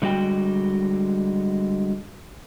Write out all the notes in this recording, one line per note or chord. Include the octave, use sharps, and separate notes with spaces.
D3 G3 G#3 F#4 G5